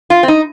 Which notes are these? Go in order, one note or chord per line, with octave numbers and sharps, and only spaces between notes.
F4
C4
D#4